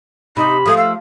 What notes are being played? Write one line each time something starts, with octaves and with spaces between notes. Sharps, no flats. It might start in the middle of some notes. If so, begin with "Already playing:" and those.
C3 D#4 B5
F3 A3 D#6
F5 E6